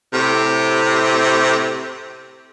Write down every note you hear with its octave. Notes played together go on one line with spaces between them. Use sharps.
A2 C3